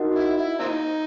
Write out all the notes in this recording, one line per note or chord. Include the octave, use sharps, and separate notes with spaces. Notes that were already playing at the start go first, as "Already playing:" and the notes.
Already playing: D#4 F#4 A#4 D#5 F#5
E4
E4
A#3 C4 D#4